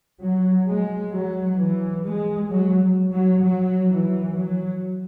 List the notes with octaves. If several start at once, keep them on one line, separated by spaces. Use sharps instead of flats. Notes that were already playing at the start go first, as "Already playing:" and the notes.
F#3
G#3
F#3
E3
G#3
F#3
F#3
F#3
E3
F#3